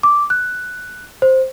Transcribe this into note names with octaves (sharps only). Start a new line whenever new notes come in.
D6
F#6
C5